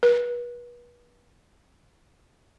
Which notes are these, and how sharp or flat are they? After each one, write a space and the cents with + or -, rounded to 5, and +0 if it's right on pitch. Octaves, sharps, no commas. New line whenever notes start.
B4 -35